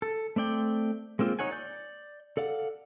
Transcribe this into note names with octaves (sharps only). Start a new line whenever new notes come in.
A4
A3 C4 D5 G5
G#3 A#3 C4 F4
D#4 C#5 F#5 G#5
D5 G6
A4 D5 F5 F#5